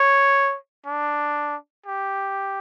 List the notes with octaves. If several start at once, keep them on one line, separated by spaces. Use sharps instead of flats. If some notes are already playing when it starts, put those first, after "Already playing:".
Already playing: C#5
D4
G4